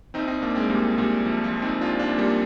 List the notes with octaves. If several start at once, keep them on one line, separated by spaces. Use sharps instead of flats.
A#1 C4 D#4
C4 D#4
A#1 A#3 D4
G#3 C4
A#2 G3 A#3
A#2 G3
A#1 F3
F3
A#1
C4 D#4
A#2 D4 F4
D4 F4
A#2
G3 A#3